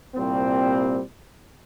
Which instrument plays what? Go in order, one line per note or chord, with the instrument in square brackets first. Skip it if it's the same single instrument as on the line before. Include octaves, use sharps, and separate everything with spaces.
[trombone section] C2 A#2 G3 C4